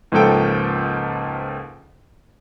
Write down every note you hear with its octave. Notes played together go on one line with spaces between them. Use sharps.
C#2 G#2 F3 A#3 A4 G5